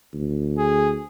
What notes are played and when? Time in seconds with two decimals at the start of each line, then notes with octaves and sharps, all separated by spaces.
0.13 D2
0.58 G#4